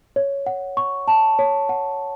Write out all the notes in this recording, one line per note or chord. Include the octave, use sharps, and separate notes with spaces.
C#5
F#5
C#6
A5
C#5
F#5